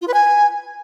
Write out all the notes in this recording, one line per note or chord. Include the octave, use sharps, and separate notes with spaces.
F4
B4
G#5